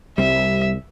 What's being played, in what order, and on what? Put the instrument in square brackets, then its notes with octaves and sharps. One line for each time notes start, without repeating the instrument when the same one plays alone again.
[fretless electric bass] C2 [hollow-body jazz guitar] G3 C4 [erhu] E5